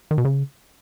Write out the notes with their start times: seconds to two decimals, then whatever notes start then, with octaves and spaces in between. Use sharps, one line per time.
0.11 D#3
0.18 B2
0.25 C#3